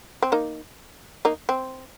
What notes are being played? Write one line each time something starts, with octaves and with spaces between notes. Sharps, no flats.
C4
A#3 D#4
A#3 D#4
C4